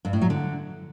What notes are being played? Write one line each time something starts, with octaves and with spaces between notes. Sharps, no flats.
G2
A2
F#3
D3